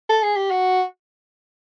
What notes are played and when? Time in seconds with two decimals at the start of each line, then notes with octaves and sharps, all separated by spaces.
0.09 A4
0.22 G#4
0.36 G4
0.50 F#4